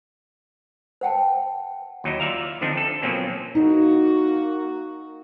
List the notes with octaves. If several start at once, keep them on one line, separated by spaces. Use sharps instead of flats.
C5 F#5 G5 A5
D#2 F#3 D#4 E4
F4 D5 E5 F5 A#5
D3 F3 C4 D4 D#4
A4
B2 F3 F#3 A#3 C4 C#4
A#3 D#4 F#4